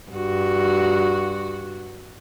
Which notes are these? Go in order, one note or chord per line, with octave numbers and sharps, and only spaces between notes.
G2 F#4